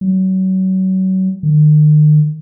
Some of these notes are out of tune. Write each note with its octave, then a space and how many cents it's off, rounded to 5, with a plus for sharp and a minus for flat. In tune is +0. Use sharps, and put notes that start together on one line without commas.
F#3 +30
D#3 -45